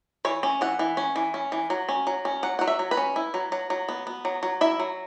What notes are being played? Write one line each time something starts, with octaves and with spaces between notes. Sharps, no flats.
E3 C#5
C#4
E3 F#5
E3
C#4
E3
C#4
E3
F#3
C#4
F#3
C#4
F#3 F#5
F#3 F#5
E5
F#3
B4
C#4
E4
F#3
F#3
F#3
B3
B3
F#3
F#3
E4 E5
F#3